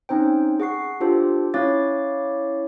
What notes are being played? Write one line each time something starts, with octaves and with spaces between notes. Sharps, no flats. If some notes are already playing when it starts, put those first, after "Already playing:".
C4 C#4 D#4 C5 G5
G#4 F#5 C#6 C7
D4 F4 G4 A4 C5
C#4 E4 C#5 F5 D6 A6